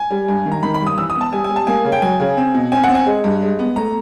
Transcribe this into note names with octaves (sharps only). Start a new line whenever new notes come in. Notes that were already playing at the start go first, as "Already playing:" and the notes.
Already playing: G#5
G3
G2
D#3
A#5
D#3 B5
B5
G2
D#6
E3 E6
D#6
B3
A5
G3 G#5
G#5
G3
A5
A#3 G#5
C#3
G5
F#3 G#5
C#3
C4
B2
C4 G#5
F#5
C4
G#5
G#3
G2
G#3
B3
A3 A#5